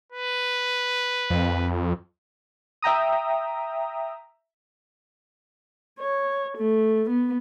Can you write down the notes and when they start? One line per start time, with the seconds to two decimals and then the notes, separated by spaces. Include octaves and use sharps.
0.12 B4
1.30 F2
2.82 E5 G5 A#5 D#6
6.00 C#5
6.57 A3
7.09 B3